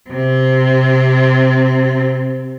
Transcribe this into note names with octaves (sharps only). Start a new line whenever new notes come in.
C3 C4